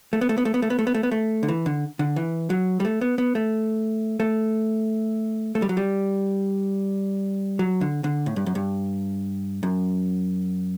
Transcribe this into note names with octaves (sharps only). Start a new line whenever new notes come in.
A3
B3
A3
B3
A3
B3
A3
B3
A3
B3
A3
B3
A3
D3
E3
D3
D3
E3
F#3
G3
A3
B3
B3
A3
A3
A3
G3
F#3
G3
F#3
D3
D3
A2
G2
F#2
G2
F#2